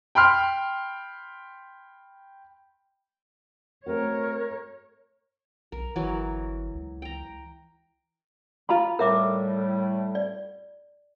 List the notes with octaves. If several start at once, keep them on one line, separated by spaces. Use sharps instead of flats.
G5 B5 C6 F6
A3 C4 F#4 A#4 C#5
B1 A#4
G1 E3 F#3 A#4
C#2
G5 A#5
F4 A#5 B5
A2 G3 A#4 E5 D6
D5